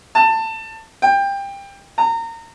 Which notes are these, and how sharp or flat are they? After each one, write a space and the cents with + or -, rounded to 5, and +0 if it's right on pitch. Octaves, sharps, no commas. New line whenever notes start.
A5 +20
G5 +20
A#5 -30